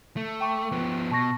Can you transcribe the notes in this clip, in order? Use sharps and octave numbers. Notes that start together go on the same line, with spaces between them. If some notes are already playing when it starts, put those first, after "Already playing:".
A3
G5 C#6 D6
F3 B3
B2 A5 C#6 A#6